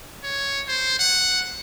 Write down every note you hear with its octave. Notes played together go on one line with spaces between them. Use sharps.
C#5
C5
F#5